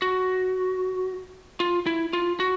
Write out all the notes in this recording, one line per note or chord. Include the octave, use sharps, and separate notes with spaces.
F#4
F4
E4
F4
F#4